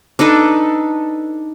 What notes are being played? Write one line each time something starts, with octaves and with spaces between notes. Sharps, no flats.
D4 D#4 A4 B4